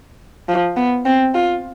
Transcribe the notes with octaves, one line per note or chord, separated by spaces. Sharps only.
F3
B3
C4
F4